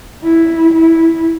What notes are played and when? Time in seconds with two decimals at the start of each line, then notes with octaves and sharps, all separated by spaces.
0.24 E4
0.74 E4